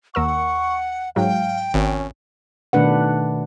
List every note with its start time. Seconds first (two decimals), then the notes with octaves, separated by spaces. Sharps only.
0.15 D#2 A#4 F#5 C#6 E6
1.16 G#2 F#3 F5 G5
1.74 G#1 C#4
2.73 B2 D#3 A3 D4 B4 F#5